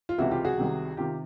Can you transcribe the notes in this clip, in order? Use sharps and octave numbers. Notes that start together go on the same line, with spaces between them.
F4
C#2 C3 E3 E4 F#4
F4 G4
F#4 G#4
C2 C3 D#3
C3 D#3 F4 G4